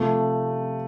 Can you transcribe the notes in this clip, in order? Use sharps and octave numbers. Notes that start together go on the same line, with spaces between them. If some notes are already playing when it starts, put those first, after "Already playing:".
Already playing: C3 F3 A3